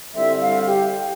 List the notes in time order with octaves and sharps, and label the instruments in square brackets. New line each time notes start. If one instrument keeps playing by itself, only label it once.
[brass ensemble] D3 G3 C4 E4 [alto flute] E5
[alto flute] F5
G4